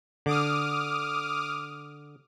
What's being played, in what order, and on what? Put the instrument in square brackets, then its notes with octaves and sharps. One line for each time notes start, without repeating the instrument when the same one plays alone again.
[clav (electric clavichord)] D3 [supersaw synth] D6 D#6 F6